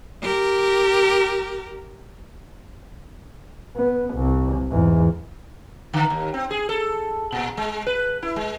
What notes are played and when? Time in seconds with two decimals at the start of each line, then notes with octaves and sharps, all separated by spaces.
0.22 G4 A#4
3.76 B3
4.14 C2
4.71 E2 G#2
5.93 D3
6.10 D#2
6.34 C4
6.51 G#4
6.69 A4
7.32 A#2
7.57 G#3
7.86 B4
8.22 E4
8.36 G#3